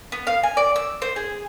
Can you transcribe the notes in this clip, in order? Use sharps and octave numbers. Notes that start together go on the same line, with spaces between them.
B3
F5
G#5
D5
E6
C5
G#4